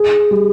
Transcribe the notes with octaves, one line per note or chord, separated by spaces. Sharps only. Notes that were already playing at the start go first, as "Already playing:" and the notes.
Already playing: G#4
G3